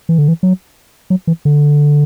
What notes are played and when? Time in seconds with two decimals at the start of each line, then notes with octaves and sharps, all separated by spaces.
0.09 E3
0.18 D3
0.28 E3
0.43 F#3
1.10 F#3
1.27 E3
1.45 D3